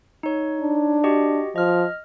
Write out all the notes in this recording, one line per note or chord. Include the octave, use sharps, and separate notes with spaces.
D#4 C#5
D4
F#4 G4 D#5
F3 D#5 F6